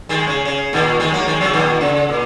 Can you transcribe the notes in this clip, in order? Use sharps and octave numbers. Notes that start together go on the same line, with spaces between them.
D#3 G#3
C#3
C#3
A#2 D#3
D#3 G#3
F#3 A#3
D#3 G#3
C#3 F#3
A#2 D#3
C#3
A#2